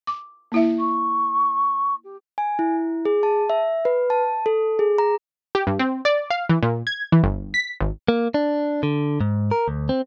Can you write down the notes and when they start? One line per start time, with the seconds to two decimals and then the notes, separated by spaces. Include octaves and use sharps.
0.07 D6
0.52 A#3 E4 E5
0.79 C#6
2.04 G4
2.38 G#5
2.59 E4
3.05 G#4
3.23 A5
3.50 E5
3.85 B4
4.10 A5
4.46 A4
4.79 G#4
4.98 A#5
5.55 G4
5.67 G2
5.79 C4
6.05 D5
6.30 F5
6.49 E3
6.63 A#2
6.87 G#6
7.12 E3
7.24 G1
7.54 B6
7.81 G#1
8.08 A#3
8.34 D4
8.83 D3
9.21 G#2
9.51 A#4
9.68 D2
9.89 C4